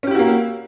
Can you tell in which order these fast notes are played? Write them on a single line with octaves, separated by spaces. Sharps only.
C#4 G4 E4 F#4 A#3